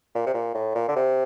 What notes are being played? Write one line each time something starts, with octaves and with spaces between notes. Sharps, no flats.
A#2
C3
A#2
A2
A#2
D3
C3